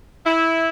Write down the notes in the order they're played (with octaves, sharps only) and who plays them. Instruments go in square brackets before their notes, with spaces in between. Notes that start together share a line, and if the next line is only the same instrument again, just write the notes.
[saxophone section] E4